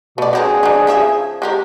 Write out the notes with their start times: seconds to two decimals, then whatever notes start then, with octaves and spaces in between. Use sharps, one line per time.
0.18 B2 A3 D5
0.33 F#3 C4 D4 G#4
0.63 D4 D#4
0.87 C#3 F3 E5
1.42 G#3 G4 A#4